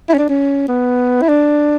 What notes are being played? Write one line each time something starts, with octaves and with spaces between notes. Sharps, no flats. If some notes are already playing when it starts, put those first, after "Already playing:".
E4
C#4
D4
C#4
B3
E4
D4